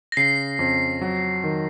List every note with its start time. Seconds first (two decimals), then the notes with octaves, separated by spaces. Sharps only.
0.12 A#6
0.17 C#3 C7
0.59 F2
1.01 F#3
1.44 D#3